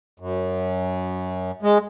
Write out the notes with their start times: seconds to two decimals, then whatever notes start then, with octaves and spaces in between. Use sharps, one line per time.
0.20 F#2
1.63 G#3